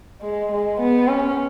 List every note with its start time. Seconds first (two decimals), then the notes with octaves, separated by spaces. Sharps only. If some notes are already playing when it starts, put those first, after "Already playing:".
0.22 G#3
0.52 G#3
0.80 B3
1.08 C#4